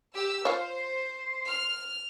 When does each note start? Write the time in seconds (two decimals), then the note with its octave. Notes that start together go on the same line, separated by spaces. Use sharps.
0.14 G4 E6
0.45 F4 C5 C#5 F5
0.76 C6
1.48 F6